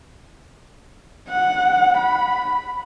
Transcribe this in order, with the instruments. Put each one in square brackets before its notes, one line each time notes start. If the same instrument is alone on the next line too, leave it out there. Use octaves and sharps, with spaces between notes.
[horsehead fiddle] F#5
B5